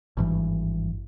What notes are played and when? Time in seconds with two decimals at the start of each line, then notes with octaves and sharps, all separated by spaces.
0.17 G#1 G2 E3